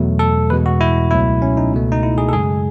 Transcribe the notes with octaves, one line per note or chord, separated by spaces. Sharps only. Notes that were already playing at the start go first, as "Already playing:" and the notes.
Already playing: E2 B2 F#3 A3
A4
E2 B2 G#3 B4
F#4
E4
C#2 B2 F#3 A3 E4
C#4
D#4
C#2 B2 A3
D#4
E4
G#4
A4
F#2 C#3 G#3 G#4